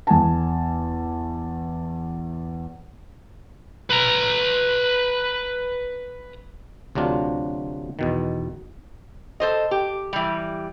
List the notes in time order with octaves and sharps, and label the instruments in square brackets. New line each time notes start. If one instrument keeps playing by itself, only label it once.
[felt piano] E2 G#5 A5
[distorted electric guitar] B4 A#5
[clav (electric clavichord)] D2 C3 F#3 D4 F4
E2 B2 D#3
[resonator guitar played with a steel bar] A4 C5 D#5
G4
E3 G3